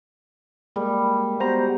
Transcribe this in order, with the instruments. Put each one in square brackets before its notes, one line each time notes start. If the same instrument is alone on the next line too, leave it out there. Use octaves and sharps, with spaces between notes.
[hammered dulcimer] G3 [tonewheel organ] G#3 A#3
[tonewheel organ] G#3 F#4 [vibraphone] B3 G4 [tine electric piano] C5 A#5